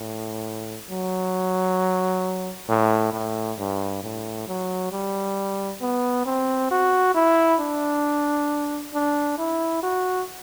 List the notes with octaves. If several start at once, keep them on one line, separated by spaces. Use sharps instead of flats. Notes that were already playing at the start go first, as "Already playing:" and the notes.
Already playing: A2
F#3
A2
A2
G2
A2
F#3
G3
B3
C4
F#4
E4
D4
D4
E4
F#4